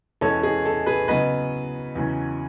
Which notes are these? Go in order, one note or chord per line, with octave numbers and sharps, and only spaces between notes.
E2 B2 G#3 C#4 A4 C#5
G#4
A4
G#4 B4
C#3 F#3 B3 B4 D#5
E2 C#3 F#3 C#4